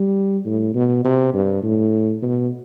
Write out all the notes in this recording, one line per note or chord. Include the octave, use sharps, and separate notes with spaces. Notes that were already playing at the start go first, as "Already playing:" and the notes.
Already playing: G3
A2
B2
C3
G2
A2
B2